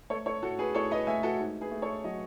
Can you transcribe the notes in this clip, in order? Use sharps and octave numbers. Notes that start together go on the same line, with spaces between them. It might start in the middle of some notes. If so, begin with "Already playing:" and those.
A3 A4 C#5
A4 C#5
A2 F#4 A4
G#4 B4
A2 A4 C#5
B4 D#5
A3 E5 G#5
F#4 A4
G#2
G#4 B4
A3
A4 C#5
F#3 D#5 F#5